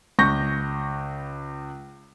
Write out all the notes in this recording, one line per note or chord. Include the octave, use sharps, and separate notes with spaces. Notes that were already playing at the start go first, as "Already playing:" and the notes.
C#2 C#6 G6 A#6